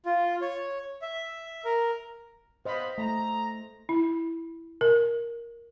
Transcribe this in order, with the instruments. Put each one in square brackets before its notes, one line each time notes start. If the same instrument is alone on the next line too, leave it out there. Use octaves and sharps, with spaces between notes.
[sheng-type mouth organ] F4
C#5
E5
A#4
[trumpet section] B3 F5 B5 [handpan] C5 D#5
[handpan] A3 [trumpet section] A#5
[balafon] E4
A#4